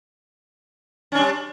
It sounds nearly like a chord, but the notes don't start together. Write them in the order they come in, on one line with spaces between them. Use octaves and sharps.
C#4 D4 G3